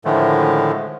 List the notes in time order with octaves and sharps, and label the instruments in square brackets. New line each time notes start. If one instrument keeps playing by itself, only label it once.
[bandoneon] A2 D3 D#3 F3 G#3 A3